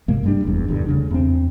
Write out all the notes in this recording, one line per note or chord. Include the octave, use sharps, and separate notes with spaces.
G#2 C3 G#3 A#3
G2 G3 D4
F1 E2
D#1 E2 G2 D3
D2 C#3 D4
E2 C4